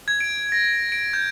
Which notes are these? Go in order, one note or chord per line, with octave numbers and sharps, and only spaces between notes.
G#6
D7
A#6
D7
G6